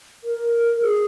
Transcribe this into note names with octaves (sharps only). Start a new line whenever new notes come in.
A#4
G#4